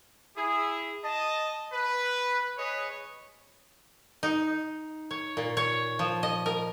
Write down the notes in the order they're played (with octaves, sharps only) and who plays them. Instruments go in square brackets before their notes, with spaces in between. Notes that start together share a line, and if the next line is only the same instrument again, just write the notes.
[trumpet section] E4 G#4
D#5 A5
B4
G#4 B4 C#5 D#5
[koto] D#4
C#5
A#2
C#5
F3
D#5
A#4